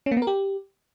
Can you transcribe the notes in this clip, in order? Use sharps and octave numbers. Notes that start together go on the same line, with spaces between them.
C#4
A#3
B3
A#4
G4